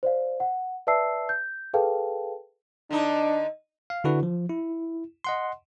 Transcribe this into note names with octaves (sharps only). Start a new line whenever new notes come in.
C5 D5 F5
F#5
B4 D5 E5 A5 E6 C7
G6
G#4 A4 B4 F5 G5 A5
D3 D4 D#4
F5
D3 D4 E4 F#4 B4
F3
E4
D#5 F#5 C6